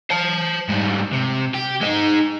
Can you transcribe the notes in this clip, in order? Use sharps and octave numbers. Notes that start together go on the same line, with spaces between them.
C5 A5
G#2 G3
C3
G4
G#3 D#4